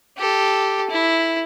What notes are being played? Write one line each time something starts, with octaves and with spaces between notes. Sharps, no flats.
G4 A4
E4